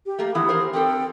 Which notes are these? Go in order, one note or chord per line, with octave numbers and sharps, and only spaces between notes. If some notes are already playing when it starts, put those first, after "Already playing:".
G4
A3 A#3
E3 B3 E4 D#6
G#4 A#4 C5
C4 G4 A4 G5